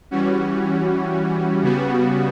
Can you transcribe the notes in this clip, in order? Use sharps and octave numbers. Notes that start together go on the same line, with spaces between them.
E3 G3 C#4 F#4
C#3 G3 B3 F#4